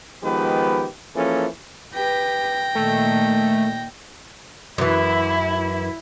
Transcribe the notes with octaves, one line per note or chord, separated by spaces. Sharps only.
D#3 F3 G#3 B3 G4 B4
E3 F3 A#3 C#4 G#4 A4
G4 B4 G5 A#6
A#2 D#3 A3
F#2 E3 E4